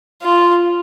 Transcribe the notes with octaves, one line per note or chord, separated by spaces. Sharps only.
F4